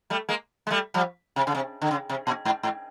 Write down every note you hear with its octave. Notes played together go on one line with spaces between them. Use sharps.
G3 A3
G#3 A#3
G#3
G3 A3
F3 G3
C3
C#3
C3
D3
C#3
C3
A#2
G#2
G#2